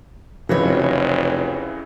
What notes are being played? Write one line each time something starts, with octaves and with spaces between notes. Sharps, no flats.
F1 C#3 E3 C4 F#4 B4 C#5